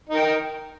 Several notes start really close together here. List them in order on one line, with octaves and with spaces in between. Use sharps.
D#4 A#4 G5